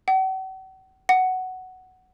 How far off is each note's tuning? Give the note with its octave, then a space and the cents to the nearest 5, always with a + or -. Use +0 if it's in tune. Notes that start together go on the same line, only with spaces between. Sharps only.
F#5 +45
F#5 +10